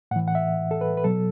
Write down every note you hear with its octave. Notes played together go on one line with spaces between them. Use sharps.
A2 E3 F#5
F#5
E5
A4
B4
B4
B2 F#3 A4